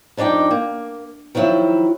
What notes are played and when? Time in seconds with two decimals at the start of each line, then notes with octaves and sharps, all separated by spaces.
0.17 F2 D4 D#4 D5 G5
0.51 A#3
1.35 D#3 F3 F#3 E4